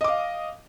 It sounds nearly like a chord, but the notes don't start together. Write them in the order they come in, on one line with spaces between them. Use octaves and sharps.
D#5 D6 F5